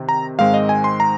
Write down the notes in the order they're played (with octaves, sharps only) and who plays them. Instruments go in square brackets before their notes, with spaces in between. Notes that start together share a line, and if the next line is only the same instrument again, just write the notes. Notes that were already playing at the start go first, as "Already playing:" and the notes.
Already playing: [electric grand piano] C3 D#3 C4
A#5
G#2 D#3 G#3 C4 F5
D#5
G#5
C6
A#5